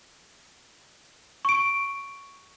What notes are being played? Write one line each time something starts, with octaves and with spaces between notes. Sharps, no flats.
C#6 D7